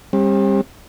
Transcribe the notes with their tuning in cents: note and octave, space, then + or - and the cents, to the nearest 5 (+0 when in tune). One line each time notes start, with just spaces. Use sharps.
G3 +25 C4 +45